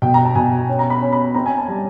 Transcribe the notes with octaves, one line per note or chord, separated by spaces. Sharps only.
B2 G5
A#5
A5
B2 G#5
C#4
A#5
B5
C#4
B5
C4 A#5
G#5
A5
G3